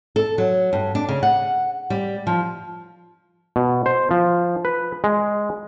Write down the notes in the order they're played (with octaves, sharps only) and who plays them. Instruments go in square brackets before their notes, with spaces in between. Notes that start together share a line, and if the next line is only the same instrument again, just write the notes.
[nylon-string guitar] A4
F#3
G2
D4
C#3
F#5
G3
F3
[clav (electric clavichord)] B2
C5
F3
B4
G#3